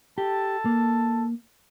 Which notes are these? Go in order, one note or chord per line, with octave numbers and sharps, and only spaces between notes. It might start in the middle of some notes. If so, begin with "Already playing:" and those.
G4 A4 A5
A#3